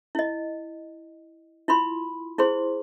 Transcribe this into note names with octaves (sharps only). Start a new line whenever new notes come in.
E4 D#5
E4 F4 B5 C6
E4 G#4 C5 C6